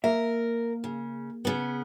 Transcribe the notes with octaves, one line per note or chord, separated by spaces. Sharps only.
A#3 A#4 E5
C#3
C#3 B3